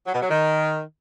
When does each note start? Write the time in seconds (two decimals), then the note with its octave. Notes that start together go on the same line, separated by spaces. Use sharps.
0.05 F#3
0.13 B2
0.21 F#3
0.29 D#3